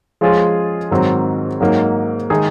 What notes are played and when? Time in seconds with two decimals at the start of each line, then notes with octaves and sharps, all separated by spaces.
0.21 F3 G#3 C#4 F4 G#4
0.91 G#2 D#3 F#3 C4 F#4
1.60 G#2 F#3 A#3 D#4
2.30 D#3 G#3 D#4 G#4